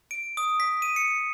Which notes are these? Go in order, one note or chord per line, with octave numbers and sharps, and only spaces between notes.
D7
D#6
B6
D#7
C#7